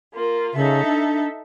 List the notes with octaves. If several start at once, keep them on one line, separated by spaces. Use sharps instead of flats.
A#3 F4
C#3 D#4 A4 E5
D4